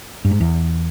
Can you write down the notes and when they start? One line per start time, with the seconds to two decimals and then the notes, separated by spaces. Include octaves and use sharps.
0.25 G2
0.31 G#2
0.40 E2